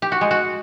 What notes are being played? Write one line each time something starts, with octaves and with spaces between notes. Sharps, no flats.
G4
F#4
G#3
F#4